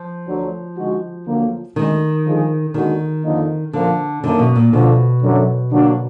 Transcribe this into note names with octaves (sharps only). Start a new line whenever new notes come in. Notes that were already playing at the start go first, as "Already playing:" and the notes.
Already playing: F3
D2 D3 F#3
D3 G#3 D#4 F#4
D2 D3 F#3 A#3
D2 D3 D#3 G#3
D3 F3 G#3 D#4 G#4
D#2 D3 D#3 G#3 D#4 F#4
F2 D3 F3 A#3 D#4
A#2 D3 F3 A#3
F#2 D3 D#3 A#3
B2
A#2
D2 B2 D3 F3
F#2 D3 F#3
D3 F#3 A#3 D4 F#4